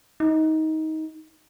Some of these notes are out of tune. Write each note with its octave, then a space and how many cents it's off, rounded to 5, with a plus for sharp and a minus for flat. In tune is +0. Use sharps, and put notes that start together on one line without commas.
D#4 +20